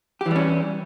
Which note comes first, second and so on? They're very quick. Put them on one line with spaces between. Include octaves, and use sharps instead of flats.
G4 E3 G3 C#4